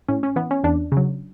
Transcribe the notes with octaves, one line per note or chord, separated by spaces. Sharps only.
A2 C#4
C#4
E3 B3
C#4
E2 D4
C#3
F#3